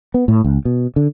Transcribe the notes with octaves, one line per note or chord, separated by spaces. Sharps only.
B3
A2
C#2
B2
D3